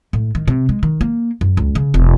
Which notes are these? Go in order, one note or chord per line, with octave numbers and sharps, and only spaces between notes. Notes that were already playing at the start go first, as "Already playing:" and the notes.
A2
D#3
C3
G#3
D#3
A#3
F#2
C#2
C#3
E1